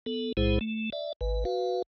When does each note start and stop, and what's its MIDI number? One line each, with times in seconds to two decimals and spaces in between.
0.06 0.33 59
0.06 0.33 69
0.37 0.59 35
0.37 0.59 45
0.37 0.59 56
0.37 0.59 64
0.37 0.59 68
0.37 0.59 72
0.61 0.90 57
0.93 1.13 74
0.93 1.13 76
1.21 1.45 32
1.21 1.45 71
1.45 1.82 66
1.45 1.82 71
1.45 1.82 77